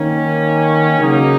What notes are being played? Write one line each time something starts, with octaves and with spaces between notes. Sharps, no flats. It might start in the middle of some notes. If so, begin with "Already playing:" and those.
Already playing: D#3 A#3 C#4
C#3 F#3 A#3 D#4